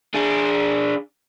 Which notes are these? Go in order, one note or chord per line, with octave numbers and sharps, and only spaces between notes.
D4 G#4